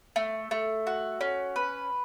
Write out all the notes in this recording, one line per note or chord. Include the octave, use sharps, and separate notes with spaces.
A3
A3
F#4
C#4
B4